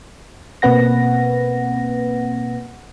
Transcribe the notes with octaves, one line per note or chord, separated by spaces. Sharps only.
B2 A#3 C4 B4 F#5 A#6